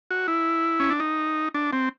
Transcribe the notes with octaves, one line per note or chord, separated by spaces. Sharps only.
F#4
E4
C#4
D4
D#4
D4
C4